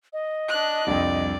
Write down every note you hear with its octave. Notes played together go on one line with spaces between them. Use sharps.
D#5
D4 F#6
C2 F2 G3 D4 D5